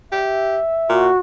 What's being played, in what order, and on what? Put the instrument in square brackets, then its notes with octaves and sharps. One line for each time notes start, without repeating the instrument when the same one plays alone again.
[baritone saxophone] G4 [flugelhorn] E5
[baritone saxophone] A#2 [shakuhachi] F#4